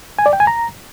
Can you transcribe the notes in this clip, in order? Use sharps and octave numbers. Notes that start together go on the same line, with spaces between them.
G#5
D5
G5
G#5
A#5